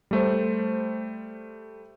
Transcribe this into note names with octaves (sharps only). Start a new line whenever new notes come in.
G3 A3 C5